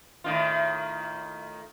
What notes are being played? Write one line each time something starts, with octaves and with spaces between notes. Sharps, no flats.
A2 D#3 F4